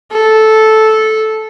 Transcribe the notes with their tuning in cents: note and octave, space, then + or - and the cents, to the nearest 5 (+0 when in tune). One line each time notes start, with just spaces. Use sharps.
A4 -10